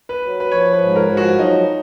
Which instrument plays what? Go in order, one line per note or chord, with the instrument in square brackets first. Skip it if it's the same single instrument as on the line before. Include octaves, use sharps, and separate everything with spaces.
[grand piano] B4
[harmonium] F#3
[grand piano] B4
[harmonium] F3 [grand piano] C#5
[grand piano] B4
[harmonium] G#2
[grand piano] A#4
[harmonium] F3
[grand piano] F#4
[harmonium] F#3 [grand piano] D#4